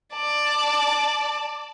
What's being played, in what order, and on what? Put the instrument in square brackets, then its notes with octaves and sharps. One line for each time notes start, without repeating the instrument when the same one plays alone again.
[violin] D5 A5